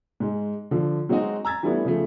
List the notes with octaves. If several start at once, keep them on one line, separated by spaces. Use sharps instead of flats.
G#2 G#3
D3 F3
F#3 G#3 C4 D#4 F#4 D#5
A#5 E6 G#6 A6
E3 G3 A3 B3 D4 E4
C#3 F3 A3